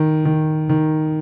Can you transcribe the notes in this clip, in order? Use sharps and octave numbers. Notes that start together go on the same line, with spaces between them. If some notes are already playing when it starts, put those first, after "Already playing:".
Already playing: D#3
D#3
D#3